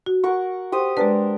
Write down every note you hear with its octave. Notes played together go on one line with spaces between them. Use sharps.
F#4
A#4 F#5 C#6
G4 C5 D#6
G#3 D4 A#4 B4